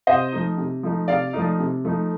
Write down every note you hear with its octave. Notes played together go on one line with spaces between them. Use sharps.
C3 C5 D#5
F3 A3 D#4
C3
F3 A3 D#4
C3 D5 F5
F3 A3 D#4
C3
F3 A3 D#4